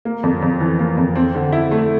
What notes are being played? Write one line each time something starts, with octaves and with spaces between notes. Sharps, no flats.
A#3
F2
F2
E3
A#3
F2
C4
D3
E4
A3